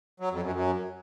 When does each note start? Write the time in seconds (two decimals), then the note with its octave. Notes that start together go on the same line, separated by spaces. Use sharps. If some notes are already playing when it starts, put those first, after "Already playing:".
0.20 F#3
0.31 F2
0.42 F#2
0.53 F#2